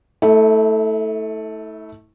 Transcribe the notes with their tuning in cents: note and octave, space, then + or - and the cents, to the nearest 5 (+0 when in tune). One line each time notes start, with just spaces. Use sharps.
A3 +0 E4 -35